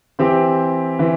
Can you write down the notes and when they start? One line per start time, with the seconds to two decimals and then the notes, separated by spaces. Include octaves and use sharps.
0.19 E3 C4 G4
0.99 E3